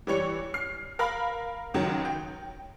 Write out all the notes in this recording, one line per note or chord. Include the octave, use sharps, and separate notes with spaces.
E3 G3 C#5 C#7
F6 C7
A#4 F5 B5
C#2 D#3 F#3
G5